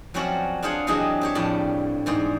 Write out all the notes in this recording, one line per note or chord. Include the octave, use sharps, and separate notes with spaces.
F3 F#3 C4 C#4 F#4 D5
D4 F4 G#4 C5 F#5
E3 F#3 D4 G4 G#4 D#5
C4 G4 C#5
F2 A2 G3 D4
E2 G#2 C5 D5